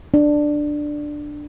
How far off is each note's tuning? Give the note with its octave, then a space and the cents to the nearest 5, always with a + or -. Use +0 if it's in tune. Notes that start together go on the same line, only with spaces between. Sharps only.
D4 +10